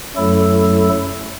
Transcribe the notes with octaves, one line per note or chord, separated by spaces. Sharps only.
F#2 F#3 A3 E4 A4